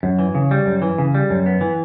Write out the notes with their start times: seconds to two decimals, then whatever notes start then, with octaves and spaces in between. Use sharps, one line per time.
0.03 F#2
0.19 E3
0.35 C#3
0.51 G3
0.66 F#2
0.82 E3
0.98 C#3
1.15 G3
1.30 F#2
1.46 B3
1.61 E3